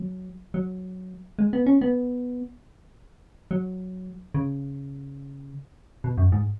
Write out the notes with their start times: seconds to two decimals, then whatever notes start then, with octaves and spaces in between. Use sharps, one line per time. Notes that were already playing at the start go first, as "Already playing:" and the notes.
Already playing: F#3
0.54 F#3
1.39 G#3
1.53 B3
1.66 C#4
1.81 B3
3.51 F#3
4.34 C#3
6.04 B2
6.18 F#2
6.32 G#2